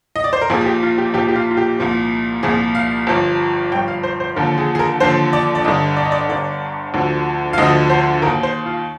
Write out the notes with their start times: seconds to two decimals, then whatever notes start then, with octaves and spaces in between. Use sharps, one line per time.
0.16 D#5
0.24 D5
0.33 C5
0.42 A#4
0.50 A#1 A#2 F3 G#4
0.61 G#4
0.66 G4
0.83 F4
0.98 G4
1.14 A#1 A#2 F3 G4
1.28 G4
1.35 F4
1.51 F4
1.57 G4
1.79 C2 A#2 F3
2.43 C2 A#2 F3 G#4
2.75 F5
3.07 G1 G2 F3
3.72 G1 G2 F3 G5
3.88 F5
4.03 C5
4.20 C5
4.36 D#2 D3 F3 A#4
4.58 G#4
4.75 G#4
4.79 A#4
5.00 D#2 D3 F3 C5
5.33 D5
5.55 D5
5.64 G1 G2 D3 D#5
5.97 D5
6.05 D#5
6.12 D5
6.29 G1 G2 D3 D5
6.94 D2 D3 F3
7.53 F5
7.58 D2 D3 F3 D#5
7.90 C5
8.22 D#2 D#3 A#4
8.43 C5
8.66 F4